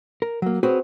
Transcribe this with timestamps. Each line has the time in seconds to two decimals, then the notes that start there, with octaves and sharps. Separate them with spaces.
0.22 A#4
0.42 F#3 A#3
0.63 C4 F#4 G#4 B4 C#5